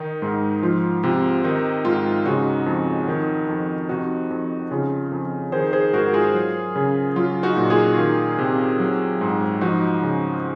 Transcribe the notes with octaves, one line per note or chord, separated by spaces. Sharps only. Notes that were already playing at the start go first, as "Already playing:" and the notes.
Already playing: D#3 D#4
G#2
F3 F4
C3 F4
D#3 D#4
G#2 F4
C#3 D#4 F#4
F2
D#3
F2
C3 D#4 F#4
F2
C#3 F4
F2
D#3 G#4 C5
G#4 C5
G#2 F#4 A#4
F4 G#4
F#3
C#3
F#3 F4
D#4 F#4
A#2
F4 G#4
D#3
C3
F#3
G#2
F3 D#4 F#4
C#3